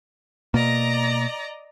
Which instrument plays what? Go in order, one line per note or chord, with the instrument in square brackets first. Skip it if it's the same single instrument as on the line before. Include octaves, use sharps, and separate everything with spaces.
[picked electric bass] B2 A#3 [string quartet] D5 D#5 A#5